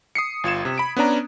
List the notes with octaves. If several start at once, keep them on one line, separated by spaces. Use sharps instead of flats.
D#6 C7 C#7
G1 F4 G#6 E7
C3
B5 D7
B3 C#4 D4 A#5